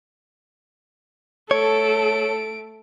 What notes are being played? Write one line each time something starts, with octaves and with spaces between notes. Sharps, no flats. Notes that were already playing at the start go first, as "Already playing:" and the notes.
A3 A4 C#5 D7